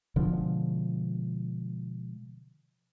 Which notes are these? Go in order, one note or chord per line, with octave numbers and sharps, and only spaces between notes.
B2 D3 F3 G#3